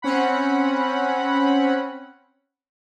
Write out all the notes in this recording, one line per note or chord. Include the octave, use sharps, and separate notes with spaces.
C4 C#4 F#5 B5